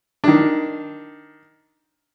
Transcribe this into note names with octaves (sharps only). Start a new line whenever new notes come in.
D#3 D4